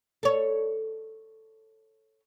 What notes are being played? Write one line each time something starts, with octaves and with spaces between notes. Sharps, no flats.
A4 C#5